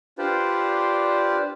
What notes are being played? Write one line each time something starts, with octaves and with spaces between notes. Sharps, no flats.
D4 F4 G4 B4 C5 D5